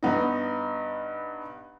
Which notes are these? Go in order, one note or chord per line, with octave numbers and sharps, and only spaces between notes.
G2 B3 D#4